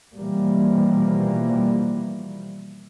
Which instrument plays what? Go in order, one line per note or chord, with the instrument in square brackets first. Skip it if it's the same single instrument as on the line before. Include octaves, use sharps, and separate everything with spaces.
[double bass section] B2 E3 F3 G3 A#3